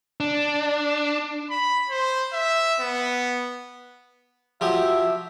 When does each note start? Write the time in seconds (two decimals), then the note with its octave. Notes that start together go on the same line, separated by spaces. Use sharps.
0.20 D4
1.50 B5
1.89 C5
2.33 E5
2.80 B3
4.61 F3 F#3 G4 E5